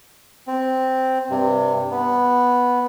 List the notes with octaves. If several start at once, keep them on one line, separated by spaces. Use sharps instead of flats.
C4
G2 C3
B3